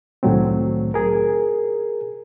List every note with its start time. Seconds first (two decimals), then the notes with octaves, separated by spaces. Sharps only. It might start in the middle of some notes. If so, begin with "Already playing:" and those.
0.23 C2 A2 D#3 F#3 A3 C4
0.94 G#4 A#4